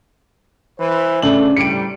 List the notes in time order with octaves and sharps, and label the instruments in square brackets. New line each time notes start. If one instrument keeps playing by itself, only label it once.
[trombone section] E3 B4 C5
[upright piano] C#3 D4 F#7 [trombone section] A3
[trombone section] A2 C3 G3 [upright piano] C#7 D7